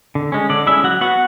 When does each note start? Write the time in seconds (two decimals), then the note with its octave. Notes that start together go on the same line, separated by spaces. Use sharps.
0.15 D3
0.32 G#3 C#4
0.49 D3 D4 D5
0.66 G#3 C#4 E4 E5
0.84 F#3 F#4 F#5
1.01 B3 F#4 F#5